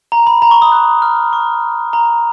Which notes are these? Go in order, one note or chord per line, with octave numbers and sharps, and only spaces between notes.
A#5
B5
A#5
C#6
D#6
F#6
F6
C#6
A#5